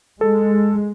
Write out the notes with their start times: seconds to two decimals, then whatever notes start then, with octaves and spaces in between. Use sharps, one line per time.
0.21 G#3 A4